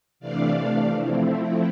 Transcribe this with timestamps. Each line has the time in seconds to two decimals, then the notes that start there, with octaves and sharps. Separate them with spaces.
0.20 C3 E3 A3 D4 D5 F5
0.54 D5 F5
0.88 F3 A3 C4 E4